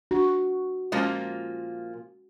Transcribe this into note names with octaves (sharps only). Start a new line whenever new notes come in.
D4 F#4
A#2 F3 G#3 A#3 C#4